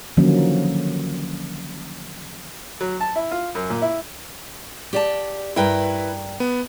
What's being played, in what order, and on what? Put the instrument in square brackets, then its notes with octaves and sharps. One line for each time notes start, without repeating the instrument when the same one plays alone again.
[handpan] D3 D#3 F3 F#3 A#3 C#4
[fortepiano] F#3
A5
E4
F4
F#2
A#2
E4
[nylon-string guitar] G4 D5 A5
[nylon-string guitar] G2 A#4 G5 [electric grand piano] E4 B4
[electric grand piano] B3